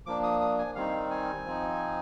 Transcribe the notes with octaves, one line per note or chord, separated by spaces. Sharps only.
F3 A#3 D4 D6
D#6
D#6
G#5
D#3 G3 C4 D#4 F5
G#5
F3 C4 D#4